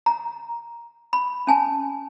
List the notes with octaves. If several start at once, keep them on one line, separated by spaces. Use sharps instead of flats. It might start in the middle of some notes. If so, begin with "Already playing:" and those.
A#5
B5
C#4 G#5 A5